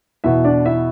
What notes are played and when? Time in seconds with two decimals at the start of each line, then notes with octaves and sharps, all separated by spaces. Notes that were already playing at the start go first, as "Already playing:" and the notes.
0.24 E2 B2 E4 E5
0.44 D4 D5
0.66 E4 E5